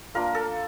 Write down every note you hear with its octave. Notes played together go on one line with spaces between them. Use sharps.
A#3 D4 F4 A#4
A4